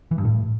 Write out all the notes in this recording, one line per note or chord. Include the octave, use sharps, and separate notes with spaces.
E3
G2
A2